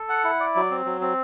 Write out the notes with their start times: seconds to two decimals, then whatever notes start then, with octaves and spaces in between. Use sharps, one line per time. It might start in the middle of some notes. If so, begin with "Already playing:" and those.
Already playing: A4
0.09 F#5
0.24 E4
0.40 D5
0.56 F#3
0.71 C4
0.86 F#3
1.01 C4